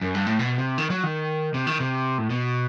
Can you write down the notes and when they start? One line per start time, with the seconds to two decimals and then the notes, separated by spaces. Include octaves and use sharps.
0.01 F#2
0.15 G2
0.27 A2
0.39 B2
0.58 C3
0.78 D#3
0.90 F#3
1.03 D#3
1.54 C3
1.67 D#3
1.80 C3
2.18 A2
2.30 B2